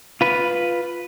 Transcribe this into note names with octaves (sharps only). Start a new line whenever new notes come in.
F4 B4